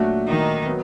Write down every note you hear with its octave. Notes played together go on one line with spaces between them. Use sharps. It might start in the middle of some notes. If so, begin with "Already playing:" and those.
Already playing: A#2 F#3 A3 D4 F#4
D#3 D#4
F#3 B3